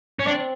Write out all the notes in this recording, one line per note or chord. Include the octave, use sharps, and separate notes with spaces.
C#4
C4 D4